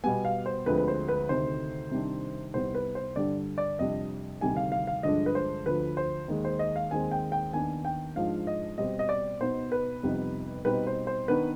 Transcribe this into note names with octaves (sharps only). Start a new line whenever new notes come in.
B2 G3 B3 G#5
F5
C5
D2 D3 F3 G#3 C4 B4
B4
C5
B4
D2 C3 D#3 C5
C3 D#3 G3 D4
C2 C3 G3 B3 D#4 C5
B4
C5
G2 D3 G3 D5
D5
F2 C3 G3 D4 D#5
D2 C3 D#3 G3 C4 G#5
F5
F5
F5
G2 D3 F3 G#3 D4 D#5
B4
C5
D2 D3 F3 B4
C5
D#2 D#3 G#3
C5
D#5
F5
D#2 D#3 G#3 C4 G#5
G5
G5
D#2 D#3 B3 D4 G#5
G5
G#2 F3 G#3 D4 F5
D#5
B2 G3 C4 D#5
D#5
D5
B2 B3 D#4 C5
B4
F2 C3 G3 B3 D#4
B2 G3 C4 D#4 B4
C5
C5
D#3 B3 D4 B4